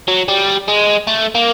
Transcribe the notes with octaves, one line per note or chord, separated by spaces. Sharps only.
F#3
G3
G#3
A3
A#3